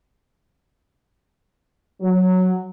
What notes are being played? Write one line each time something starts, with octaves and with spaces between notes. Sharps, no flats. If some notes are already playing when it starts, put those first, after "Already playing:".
F#3